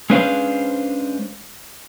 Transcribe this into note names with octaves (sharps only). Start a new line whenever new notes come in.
G#3 C#4 D4 B4 C5 F5